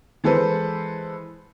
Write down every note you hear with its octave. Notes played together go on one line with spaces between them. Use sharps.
E3 G#3 A4 B4 C5